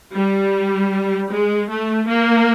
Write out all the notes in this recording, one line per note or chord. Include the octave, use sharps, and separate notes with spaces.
G3
G#3
A3
A#3